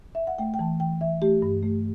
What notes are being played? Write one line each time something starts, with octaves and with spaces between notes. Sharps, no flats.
E5
F#5
A3 G5
G5
E3 A5
E3 G5
E3 E5
A3 G4
G2
A3